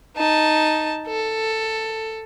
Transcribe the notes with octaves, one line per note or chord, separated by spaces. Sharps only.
D#4 A5
A4